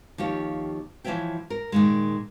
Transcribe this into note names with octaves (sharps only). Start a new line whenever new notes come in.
D#2 F3 G4 C#5
E3 F3 C#4 C#5 E5 G5
A#4
A#2 D#3 G#3